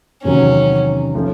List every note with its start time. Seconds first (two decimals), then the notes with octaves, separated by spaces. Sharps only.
0.23 E2 C3 D#3 F#3 C#4
1.14 F3 A3 C#4 F4